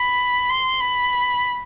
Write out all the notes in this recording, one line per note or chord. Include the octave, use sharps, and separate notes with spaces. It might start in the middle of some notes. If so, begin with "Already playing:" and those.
Already playing: B5
C6
B5